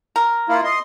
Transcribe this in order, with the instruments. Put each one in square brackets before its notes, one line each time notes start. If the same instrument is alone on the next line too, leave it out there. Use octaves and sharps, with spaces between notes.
[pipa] A#4
[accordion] A#3 E4 F4
D#5 C6